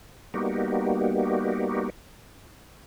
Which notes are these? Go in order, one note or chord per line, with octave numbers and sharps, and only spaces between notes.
G3 A#3 B3 D#4 F#4 G4